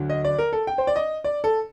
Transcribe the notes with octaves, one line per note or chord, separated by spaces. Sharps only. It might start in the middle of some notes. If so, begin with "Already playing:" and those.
Already playing: D2 D3 F#3
D#5
D5
A#4
A4
G5
C5
D5
D#5
D5
A4